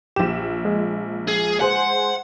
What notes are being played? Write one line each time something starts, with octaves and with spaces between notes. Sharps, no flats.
A#1 G4 E7
G#3
G#4
G#4 C5 F#5